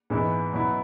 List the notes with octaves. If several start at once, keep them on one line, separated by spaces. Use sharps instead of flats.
G#2 E3 G#3 B3 E4
B2 F#3 B3 E4